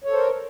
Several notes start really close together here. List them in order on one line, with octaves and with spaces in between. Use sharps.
C#5 A4 C5 A#4